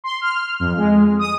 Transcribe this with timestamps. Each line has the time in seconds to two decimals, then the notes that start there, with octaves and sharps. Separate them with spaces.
0.04 C6
0.21 F6
0.60 F2
0.78 G#3
1.19 D#6